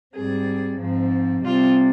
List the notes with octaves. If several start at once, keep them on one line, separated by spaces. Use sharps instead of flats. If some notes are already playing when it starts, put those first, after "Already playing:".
G#2 G3 C4 G#4
G#2 F3 C4
C3 G3 C4 F4